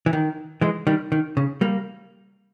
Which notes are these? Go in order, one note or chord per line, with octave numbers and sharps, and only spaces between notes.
E3
D#3
E3 G#3
D#3 G3
D#3
C#3
G3 A#3